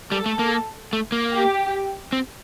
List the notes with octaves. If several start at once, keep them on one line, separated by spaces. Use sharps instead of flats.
G3 A4
A3
A#3
A3
A#3
G4
C4